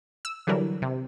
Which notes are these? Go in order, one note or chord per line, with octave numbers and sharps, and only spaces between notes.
E6
D3 E3 F#3 G3 A#4
C3